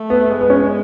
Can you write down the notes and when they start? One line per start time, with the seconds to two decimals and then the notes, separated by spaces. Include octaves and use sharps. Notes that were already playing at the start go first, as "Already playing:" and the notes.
Already playing: A3
0.10 B3
0.30 G#3 B3
0.41 B3
0.50 C#4